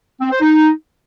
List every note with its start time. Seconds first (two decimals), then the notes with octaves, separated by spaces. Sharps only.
0.21 C4
0.31 C5
0.42 D#4